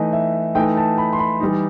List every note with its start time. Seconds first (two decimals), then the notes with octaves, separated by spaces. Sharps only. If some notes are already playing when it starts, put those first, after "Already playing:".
Already playing: E3 A3 D#4 D#5
0.13 E5
0.55 E3 A3 D#4 G5
0.77 A5
0.98 B5
1.13 C6
1.19 B5
1.40 E3 G3 D#4